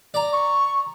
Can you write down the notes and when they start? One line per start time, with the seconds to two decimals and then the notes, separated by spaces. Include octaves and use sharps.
0.14 D5 A#5
0.32 C#6